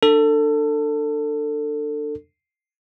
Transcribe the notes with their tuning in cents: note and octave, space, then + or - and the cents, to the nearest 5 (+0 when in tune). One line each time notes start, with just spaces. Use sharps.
D4 +20 A4 +25